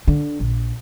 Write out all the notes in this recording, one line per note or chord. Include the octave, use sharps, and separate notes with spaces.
D3
A#1